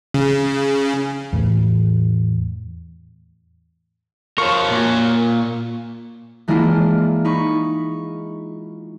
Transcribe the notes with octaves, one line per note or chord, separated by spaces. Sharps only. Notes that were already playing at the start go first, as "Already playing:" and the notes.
C#3
E2 A2
A#4 C5 C#5 F5 C#6
A#2
E3 G#3 A#3 D4 E4 F4
D#4 B5 C#6